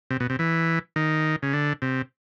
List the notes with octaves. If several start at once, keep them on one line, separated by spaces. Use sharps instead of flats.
C3
B2
C3
E3
D#3
C#3
D3
C3